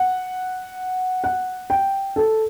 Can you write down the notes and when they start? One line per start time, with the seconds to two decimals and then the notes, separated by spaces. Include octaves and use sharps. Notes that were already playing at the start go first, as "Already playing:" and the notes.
Already playing: F#5
1.24 F#5
1.70 G5
2.16 A4